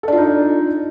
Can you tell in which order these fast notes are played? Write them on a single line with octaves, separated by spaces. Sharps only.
A4 D4 F4 D#4